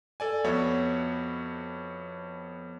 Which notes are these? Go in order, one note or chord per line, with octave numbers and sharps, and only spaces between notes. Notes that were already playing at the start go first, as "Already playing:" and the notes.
A4 D5 G#5
F2 B3 F#4 C#5 E5